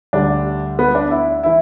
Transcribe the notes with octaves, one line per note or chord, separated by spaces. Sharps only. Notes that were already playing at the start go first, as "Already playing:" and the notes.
D2 D3 G3 D4
B3
D4
E4
E3 E4